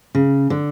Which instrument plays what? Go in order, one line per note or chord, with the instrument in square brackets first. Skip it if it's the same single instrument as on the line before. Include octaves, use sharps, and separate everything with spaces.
[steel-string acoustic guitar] C#3
D3